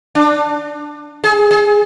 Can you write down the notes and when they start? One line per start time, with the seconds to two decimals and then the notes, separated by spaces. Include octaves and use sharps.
0.15 D4
1.24 G#4
1.51 G#4